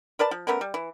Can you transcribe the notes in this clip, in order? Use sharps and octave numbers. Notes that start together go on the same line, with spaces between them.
A#4 B4 D5 A5
F3
A3 B3 C#4 A#4
G3
E3